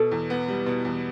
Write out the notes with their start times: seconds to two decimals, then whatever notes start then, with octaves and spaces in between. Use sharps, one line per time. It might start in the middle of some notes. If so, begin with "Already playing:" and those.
Already playing: B2 A4
0.11 E2
0.30 B3
0.48 G3
0.66 B2
0.85 E2